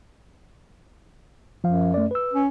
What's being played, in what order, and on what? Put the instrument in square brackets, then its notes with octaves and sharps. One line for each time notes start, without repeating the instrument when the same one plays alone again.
[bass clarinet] F#2 [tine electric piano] F3 F5
[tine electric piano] A3 D5
B4 E6
[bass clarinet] C#4